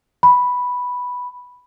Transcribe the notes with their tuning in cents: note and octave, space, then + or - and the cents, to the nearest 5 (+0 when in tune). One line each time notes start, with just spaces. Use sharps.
B5 +0